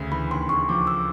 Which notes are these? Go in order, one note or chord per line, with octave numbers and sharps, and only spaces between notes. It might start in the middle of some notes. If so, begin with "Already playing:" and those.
Already playing: D2 C#3
E3 B5
D#2 C6
C#3 C#6
F3 D6
E6